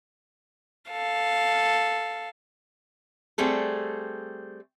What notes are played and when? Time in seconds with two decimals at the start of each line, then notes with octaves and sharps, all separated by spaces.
0.91 A4 F5
3.38 G3 A3 C4 G#4 A4